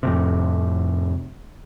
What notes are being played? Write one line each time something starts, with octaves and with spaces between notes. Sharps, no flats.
F2 A2 C3